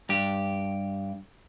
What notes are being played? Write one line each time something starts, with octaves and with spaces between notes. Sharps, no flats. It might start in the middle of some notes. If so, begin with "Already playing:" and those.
G2 G4